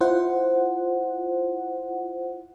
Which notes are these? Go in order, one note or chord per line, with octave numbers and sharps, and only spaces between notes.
E4 F4 C5 F#5